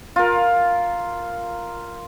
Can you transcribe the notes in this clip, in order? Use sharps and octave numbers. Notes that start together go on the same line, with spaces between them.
F4 A#4